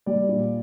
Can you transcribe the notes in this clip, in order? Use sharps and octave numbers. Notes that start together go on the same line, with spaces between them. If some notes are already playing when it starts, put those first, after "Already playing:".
G3 D5
A#2